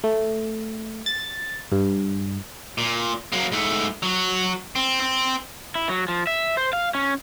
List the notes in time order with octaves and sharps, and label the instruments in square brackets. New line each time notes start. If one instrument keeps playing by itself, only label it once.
[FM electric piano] A3
A6
G2
[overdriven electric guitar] A#2
F#3 A#3
G#2 A3
F#3 F#4
C4
C4
E4
F#3
F3
E5
C5
F5
C#4